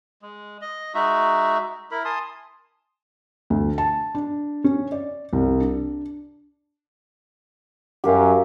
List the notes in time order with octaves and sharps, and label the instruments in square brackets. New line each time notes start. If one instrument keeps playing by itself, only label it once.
[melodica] G#3
D#5
G#3 D#4 F#4 E5
E4 A#4 B5
G#5 A5 C6 D#6
[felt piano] D2
A5
D4
C#4
D5
C2
D4
[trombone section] F#2 [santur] G4 A#4 F5